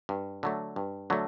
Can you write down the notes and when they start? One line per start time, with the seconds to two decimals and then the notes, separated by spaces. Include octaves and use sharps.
0.09 G2
0.43 D3 F#3 A3
0.76 G2
1.10 D3 F#3 A3